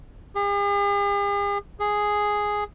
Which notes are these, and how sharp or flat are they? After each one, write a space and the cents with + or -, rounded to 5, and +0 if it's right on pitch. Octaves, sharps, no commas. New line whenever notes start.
G#4 -45
G#4 +0